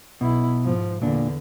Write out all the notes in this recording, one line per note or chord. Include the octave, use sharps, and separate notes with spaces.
B1 B2 E4
G#2 F3
E2 A#2 D3 D4